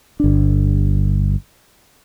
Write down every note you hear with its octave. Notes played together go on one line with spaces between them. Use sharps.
G1 D4